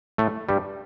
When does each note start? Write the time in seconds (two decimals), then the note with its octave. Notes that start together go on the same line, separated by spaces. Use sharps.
0.18 A2 A3
0.49 G2 G3